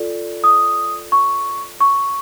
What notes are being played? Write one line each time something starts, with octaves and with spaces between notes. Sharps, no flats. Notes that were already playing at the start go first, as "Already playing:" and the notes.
Already playing: F4 A4 D5
D#6
C#6
C#6